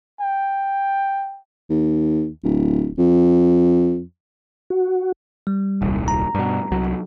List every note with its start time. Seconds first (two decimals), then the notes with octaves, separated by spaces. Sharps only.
0.21 G5
1.70 D#2
2.43 D1
2.98 F2
4.70 F#4
5.47 G3
5.82 D#1 C2
6.08 A#5
6.35 G2 B2
6.71 C2 F#3